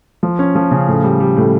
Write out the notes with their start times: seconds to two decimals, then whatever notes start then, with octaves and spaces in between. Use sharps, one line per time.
0.23 F3
0.39 C#4
0.55 F3
0.71 C#3
0.88 A2
1.04 G3
1.20 G3
1.37 A2